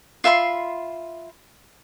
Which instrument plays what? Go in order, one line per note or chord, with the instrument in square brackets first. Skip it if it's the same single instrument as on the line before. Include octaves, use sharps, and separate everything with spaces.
[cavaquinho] F4 E5 B5 C6